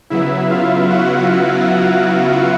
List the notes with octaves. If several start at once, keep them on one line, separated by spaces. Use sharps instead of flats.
C#3 F#3 B3 E4 E5
F4 F5
F#4 F#5